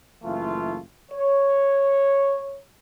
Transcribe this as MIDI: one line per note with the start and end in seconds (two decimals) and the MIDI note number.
0.24 0.80 30
0.24 0.80 52
0.24 0.80 57
0.24 0.80 65
1.11 2.58 73